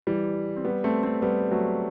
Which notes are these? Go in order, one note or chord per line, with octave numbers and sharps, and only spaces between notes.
E3 G3
C4
G3 B3
A3 C4
A3 C4
G3 B3
F#3 A3